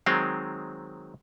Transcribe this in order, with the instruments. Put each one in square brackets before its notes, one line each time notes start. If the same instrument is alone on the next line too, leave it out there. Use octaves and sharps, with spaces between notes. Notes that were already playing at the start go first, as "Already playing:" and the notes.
[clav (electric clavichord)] D#3 F#3 G#3 C4